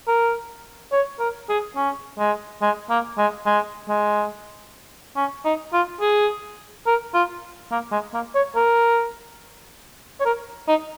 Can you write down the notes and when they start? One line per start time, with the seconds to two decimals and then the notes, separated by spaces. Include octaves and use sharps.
0.08 A#4
0.92 C#5
1.20 A#4
1.49 G#4
1.76 C#4
2.19 G#3
2.62 G#3
2.90 A#3
3.18 G#3
3.46 G#3
3.88 G#3
5.16 C#4
5.45 D#4
5.73 F4
6.01 G#4
6.86 A#4
7.14 F4
7.71 A#3
7.92 G#3
8.14 A#3
8.35 C#5
8.56 A#4
10.20 C#5
10.25 A#4
10.68 D#4